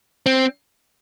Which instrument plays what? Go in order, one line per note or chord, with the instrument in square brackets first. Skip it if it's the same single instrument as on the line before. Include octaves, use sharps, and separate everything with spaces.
[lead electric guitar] C4